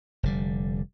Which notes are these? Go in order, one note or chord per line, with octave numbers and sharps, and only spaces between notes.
F1 D3 G3